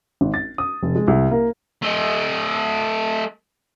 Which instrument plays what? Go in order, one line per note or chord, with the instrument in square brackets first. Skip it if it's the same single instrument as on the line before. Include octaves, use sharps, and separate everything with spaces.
[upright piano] G#1
A6
D#6
F1
G#3
C2
A#3
[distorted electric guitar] A3 D#5